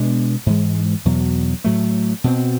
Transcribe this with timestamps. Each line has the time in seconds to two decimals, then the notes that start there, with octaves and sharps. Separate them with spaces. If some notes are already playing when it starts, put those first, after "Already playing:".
Already playing: B2 G#3 B3 D4
0.46 G#2 E3 G#3
1.05 E2 B2 F#3
1.64 A2 F#3 A3
2.24 B2 G#3 C4